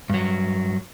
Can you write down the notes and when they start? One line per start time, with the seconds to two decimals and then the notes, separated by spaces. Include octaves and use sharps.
0.10 G2 F#3